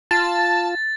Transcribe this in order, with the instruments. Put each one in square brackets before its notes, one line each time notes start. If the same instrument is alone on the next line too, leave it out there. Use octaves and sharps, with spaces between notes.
[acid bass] F4 [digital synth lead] A5 [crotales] A6